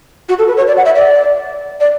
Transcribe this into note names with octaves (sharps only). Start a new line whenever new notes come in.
F#4
A4
B4
C#5
D5
F#5
E5
D5
D5